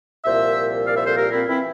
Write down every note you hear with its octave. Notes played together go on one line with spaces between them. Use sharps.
C2 A#2 F3 C5 E5
D5 F5
C5 E5
A4 C5
G4 A#4
C4 E4
E3 C4 E4